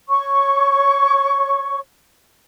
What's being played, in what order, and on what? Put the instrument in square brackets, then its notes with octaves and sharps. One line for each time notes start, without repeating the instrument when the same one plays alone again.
[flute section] C#5 C#6